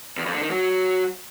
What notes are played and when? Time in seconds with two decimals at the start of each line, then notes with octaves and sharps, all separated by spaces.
0.17 E2
0.26 F2
0.34 D3
0.42 D#3
0.51 F#3